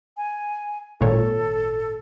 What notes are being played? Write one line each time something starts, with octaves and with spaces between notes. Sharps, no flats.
G#5
G#1 A#2 A4 C#5